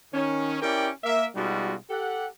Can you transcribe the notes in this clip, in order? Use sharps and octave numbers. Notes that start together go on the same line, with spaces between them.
D#3 C#4
C#4 E4 G4 A#4 D5 G5
A#3 E5
B2 G3 G#3 D#4 F4 F#4
G4 A4 F#5